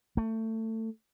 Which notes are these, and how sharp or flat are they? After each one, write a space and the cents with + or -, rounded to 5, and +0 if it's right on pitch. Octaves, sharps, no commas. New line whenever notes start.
A3 +20